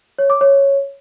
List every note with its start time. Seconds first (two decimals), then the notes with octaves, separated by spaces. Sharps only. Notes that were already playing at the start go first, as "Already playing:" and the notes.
0.18 C#5
0.30 D6
0.41 C#5